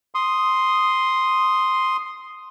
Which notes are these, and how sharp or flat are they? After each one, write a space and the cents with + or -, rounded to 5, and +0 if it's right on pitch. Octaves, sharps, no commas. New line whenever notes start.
C6 +0 D#6 +0